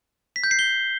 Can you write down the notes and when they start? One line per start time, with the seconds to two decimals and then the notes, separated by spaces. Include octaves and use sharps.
0.36 B6
0.44 G6
0.51 C7
0.59 G7